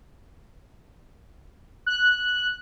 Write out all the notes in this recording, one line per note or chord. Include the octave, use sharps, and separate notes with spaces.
F#6